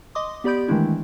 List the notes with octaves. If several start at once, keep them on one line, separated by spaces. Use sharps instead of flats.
D#5 C6 D6 D#6
B3 G4 D5 B5 G6 D7
D#3 E3 G#3 A3 D4 E4